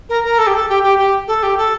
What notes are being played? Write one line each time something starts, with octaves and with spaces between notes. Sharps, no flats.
A#4
A#4
A4
G4
A4
G4
G4
G4
A4
G4
A4